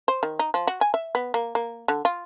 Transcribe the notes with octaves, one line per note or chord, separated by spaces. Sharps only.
C5
D#3
D#4
F3
F#4
G#5
E5
B3
A#3
A#3
D3
F4